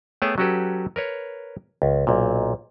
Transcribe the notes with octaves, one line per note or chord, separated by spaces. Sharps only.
A3 B3 G#4 C#5 G5 A5
F#3 C#4 F#4 G4 A4 B4
A#4 B4 C#5
C#2
B1 A#2